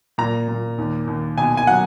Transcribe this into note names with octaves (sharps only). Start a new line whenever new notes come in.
A#2 A#5
A#2
D#2
D#2
B2 G#5
G#5
F#3 F#5